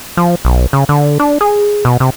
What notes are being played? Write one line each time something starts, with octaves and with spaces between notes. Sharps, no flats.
F3
B1
C#3
D3
D4
G#4
B2
C3